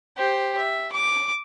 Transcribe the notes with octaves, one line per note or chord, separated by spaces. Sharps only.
G4 C5
E5
D6